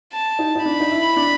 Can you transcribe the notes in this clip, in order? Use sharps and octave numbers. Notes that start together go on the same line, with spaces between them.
A5
D#4
D#4
D4 B5
D#4
E4
D4